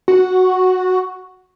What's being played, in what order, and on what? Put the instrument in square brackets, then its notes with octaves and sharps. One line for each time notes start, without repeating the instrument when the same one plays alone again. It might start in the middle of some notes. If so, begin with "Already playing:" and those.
[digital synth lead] F#4